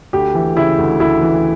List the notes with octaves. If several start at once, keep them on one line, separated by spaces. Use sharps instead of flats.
D2 G4
E3
C#3 E4
D2
D2 E4
E3